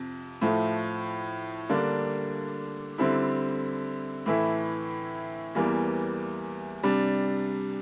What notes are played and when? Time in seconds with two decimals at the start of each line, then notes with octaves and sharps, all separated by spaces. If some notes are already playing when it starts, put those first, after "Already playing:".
Already playing: F2 C3
0.41 A2 F3 A3
1.69 D3 G3 A#3 D4
2.98 D3 G3 C4 E4
4.26 A2 E3 A3 E4
5.55 E2 E3 G3 A#3
6.83 C3 G3 D4